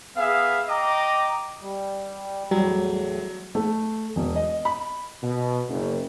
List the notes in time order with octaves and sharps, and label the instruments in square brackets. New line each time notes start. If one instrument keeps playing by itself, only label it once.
[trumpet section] B3 G#4 E5 F5
D#5 G5 A#5 D6
[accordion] G3
[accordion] E2 A2 [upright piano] F#3 [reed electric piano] G3
[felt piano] A3
E1
D#5
B5
[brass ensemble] B2
F#1